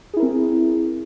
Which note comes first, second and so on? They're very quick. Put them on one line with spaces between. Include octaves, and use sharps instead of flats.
G#4 E4 A#4 C4